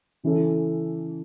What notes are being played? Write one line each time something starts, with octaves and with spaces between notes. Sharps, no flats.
C#3 E3 C#4 A4